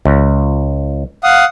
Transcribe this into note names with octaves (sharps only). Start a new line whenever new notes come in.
C#2
F5 F#5 D#6